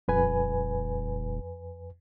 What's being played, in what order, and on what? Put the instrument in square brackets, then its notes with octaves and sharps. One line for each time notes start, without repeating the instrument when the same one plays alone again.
[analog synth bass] D#1 [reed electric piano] F2 B4 G#5